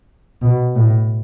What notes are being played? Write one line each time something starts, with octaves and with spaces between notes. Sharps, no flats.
B2
A2